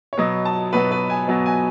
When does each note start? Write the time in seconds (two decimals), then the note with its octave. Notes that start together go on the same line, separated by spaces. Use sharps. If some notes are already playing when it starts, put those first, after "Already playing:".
0.13 C#5
0.17 B2 F#3 B3 D#5
0.45 A5
0.73 B2 F#3 B3 B4
0.92 B4
1.10 G#5
1.28 B2 F#3 B3
1.46 G#5